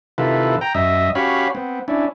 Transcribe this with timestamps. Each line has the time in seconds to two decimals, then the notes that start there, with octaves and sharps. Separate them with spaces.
0.18 C3 D#3 E4 F4 A4 B4
0.61 G5 A#5
0.75 F#2 D#5 E5
1.15 C#4 F#4 G4 C#5 F5 B5
1.55 B3 C4
1.88 C#4 D4 E4